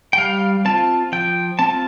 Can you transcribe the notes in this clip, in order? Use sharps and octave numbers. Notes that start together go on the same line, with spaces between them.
G5
G3 F5
C4 F4 A5
F3 G5
C4 F4 A5